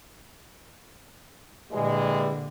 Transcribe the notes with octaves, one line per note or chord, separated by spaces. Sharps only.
A#2 D3 E3 G3 G#3